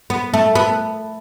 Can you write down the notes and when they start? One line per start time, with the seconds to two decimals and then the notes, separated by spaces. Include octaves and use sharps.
0.10 B3
0.34 A3
0.55 B3